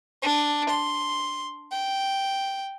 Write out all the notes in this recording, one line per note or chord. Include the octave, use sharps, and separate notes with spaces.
D4
C6
G5